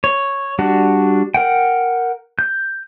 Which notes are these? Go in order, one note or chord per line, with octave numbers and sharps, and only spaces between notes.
C#5
G3 D4 F#4
A#4 F#5 G5
G6